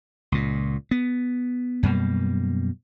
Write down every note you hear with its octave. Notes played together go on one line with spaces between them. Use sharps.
C#2 A#2
B3
F#2 B2 G3 A#3